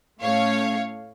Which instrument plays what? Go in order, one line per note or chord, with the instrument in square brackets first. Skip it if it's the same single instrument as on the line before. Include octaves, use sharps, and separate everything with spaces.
[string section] A2 A3 C#4 C#5 F5